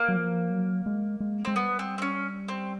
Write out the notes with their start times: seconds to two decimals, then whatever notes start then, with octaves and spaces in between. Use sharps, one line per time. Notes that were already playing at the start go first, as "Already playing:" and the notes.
Already playing: A#3
0.09 F#3
0.16 F3
0.50 F#3
0.86 G#3
1.20 G#3
1.45 G#3 C4
1.55 G3 B3
1.79 C4
1.98 C4
2.02 C#4
2.49 C4